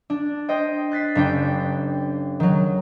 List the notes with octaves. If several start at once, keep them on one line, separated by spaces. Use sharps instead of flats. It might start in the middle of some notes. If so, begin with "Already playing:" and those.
D4
C5 D#5 G5
F#6 A6 B6 C7
F#1 D4 G5
D#3 F#3